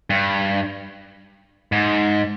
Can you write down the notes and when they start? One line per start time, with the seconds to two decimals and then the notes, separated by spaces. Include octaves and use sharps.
0.10 G2
1.72 G#2